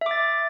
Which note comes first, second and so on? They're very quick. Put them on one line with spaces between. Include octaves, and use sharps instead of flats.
E5 D6 A6